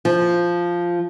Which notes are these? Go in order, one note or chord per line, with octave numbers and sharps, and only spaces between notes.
F3